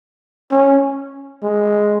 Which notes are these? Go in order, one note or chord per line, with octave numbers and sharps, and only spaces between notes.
C#4
G#3